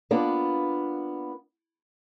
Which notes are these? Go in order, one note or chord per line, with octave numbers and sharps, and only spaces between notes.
A#3 B3 D4 F4